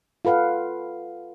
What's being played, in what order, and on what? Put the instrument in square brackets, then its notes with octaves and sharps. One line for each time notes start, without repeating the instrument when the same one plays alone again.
[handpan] F4 A4 B4 F5 F#5